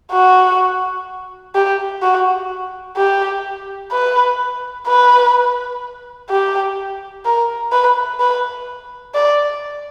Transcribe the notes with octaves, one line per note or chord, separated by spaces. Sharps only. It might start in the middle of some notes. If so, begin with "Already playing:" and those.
F#4
G4
F#4
G4
B4
B4
G4
A#4
B4
B4
D5